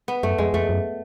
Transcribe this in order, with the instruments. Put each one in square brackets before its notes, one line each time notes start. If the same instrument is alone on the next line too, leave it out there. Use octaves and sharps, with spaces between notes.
[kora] B3
[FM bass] F#2 [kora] A3
[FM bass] F2 [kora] G#3
[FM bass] F2 [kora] A3
[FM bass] F#2